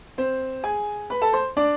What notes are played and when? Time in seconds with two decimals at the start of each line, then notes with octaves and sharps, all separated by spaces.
0.18 C4 C5
0.63 G#4 G#5
1.10 B4 B5
1.22 A4 A5
1.33 C5 C6
1.57 D4 D5